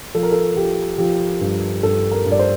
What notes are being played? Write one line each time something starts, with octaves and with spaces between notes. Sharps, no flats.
F3 A4
A#4
A4
F3 G4
F3 G4
G2
G2 A4
A#4
G2
D5
C5